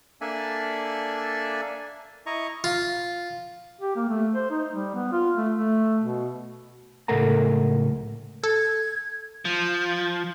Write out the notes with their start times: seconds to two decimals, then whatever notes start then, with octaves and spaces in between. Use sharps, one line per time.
0.21 A#3 D4 A4 D5 E5 G#5
2.26 E4 D#5 A#5 C#6
2.64 F4
3.81 G4
3.96 A#3
4.09 A3
4.35 C5
4.50 D#4
4.73 G3
4.94 B3
5.12 F4
5.36 A3
5.55 A3
6.02 B2
7.08 C#2 A2 A4 A#4 F#5 A#5
8.43 A4 G#6
9.45 F3